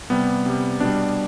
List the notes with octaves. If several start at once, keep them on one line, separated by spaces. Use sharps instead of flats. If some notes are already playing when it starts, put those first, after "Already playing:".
C3 G3 B3
C3 G3
B2 G3 D4